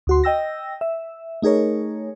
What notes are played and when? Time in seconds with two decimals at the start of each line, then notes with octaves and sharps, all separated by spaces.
0.07 D2 F#4 C6
0.24 D#5 G5 E6 A#6
0.81 E5
1.42 A3 D#4 G#4 A#4 C#5